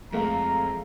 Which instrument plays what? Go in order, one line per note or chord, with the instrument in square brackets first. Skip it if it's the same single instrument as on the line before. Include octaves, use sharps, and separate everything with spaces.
[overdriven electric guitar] F2 [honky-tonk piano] G#3 A3 F5 [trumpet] A#5